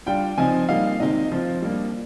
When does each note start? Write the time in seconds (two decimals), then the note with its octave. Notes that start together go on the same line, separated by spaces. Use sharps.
0.06 G3 D4 F4 G5
0.37 C3 F3 C4 D#4 G#5
0.69 G3 A#3 D#4 F5
1.00 C3 D#3 G#3 C4 D#4 D#5
1.32 F3 C4 F4
1.62 G3 A#3 D4